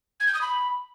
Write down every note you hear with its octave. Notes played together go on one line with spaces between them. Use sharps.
G#6
G6
D#6
B5